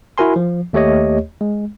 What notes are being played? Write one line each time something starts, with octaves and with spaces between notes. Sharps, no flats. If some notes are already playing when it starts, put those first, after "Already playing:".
E4 F#4 A#4 G#5 C6
F3
D#2 A3 G4 C#5 D#5
G#3